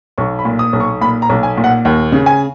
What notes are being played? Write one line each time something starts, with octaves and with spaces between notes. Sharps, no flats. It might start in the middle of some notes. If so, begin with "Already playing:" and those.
B1 C#6
B5
A#2
D#6
B1
C#6
A#2 B5
A#5
B1
G#5
A#2
F#5
D#2
C#3
G#5